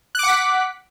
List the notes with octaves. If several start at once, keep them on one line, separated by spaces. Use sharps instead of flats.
F#5 D6 F#6 B6